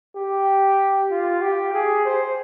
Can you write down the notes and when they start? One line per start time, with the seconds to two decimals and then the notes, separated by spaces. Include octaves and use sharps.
0.16 G4
1.11 F4
1.42 G4
1.74 G#4
2.05 C5